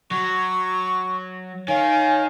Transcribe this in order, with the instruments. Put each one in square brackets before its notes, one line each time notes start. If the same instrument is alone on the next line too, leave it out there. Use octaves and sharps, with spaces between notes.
[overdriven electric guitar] F#3 [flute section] C#6
[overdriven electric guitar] D#3 [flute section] C#5 F5 G#5